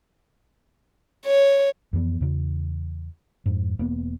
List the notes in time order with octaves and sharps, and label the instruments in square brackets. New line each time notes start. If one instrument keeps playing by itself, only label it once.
[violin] C#5
[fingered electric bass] F2 E3 B3
E2 C#3
F2 G#2
E1 A#3 B3